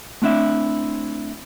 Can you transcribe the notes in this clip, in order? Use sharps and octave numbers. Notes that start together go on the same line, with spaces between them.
A3 C4 D4 E4 E5